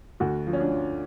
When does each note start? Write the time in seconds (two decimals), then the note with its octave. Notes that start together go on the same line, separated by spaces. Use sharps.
0.20 D2 F#4
0.47 F3
0.53 C#4
0.60 D4
0.73 F3